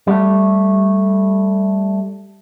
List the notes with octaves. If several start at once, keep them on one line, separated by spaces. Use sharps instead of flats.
G3 A3